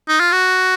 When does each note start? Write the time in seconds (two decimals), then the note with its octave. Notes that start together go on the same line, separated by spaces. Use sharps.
0.09 D#4
0.20 F4
0.32 F#4